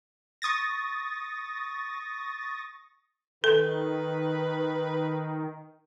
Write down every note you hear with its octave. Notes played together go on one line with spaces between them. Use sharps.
C#6 D#6 A6 A#6
D#3 A4 B4